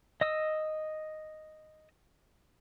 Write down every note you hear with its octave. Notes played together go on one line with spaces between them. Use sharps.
D#5 D#6 E6